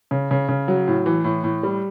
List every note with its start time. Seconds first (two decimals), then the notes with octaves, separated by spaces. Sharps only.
0.11 C#3
0.31 C#3
0.49 C#3
0.68 F#3
0.87 A2
1.06 E3
1.24 A2
1.44 A2
1.63 G3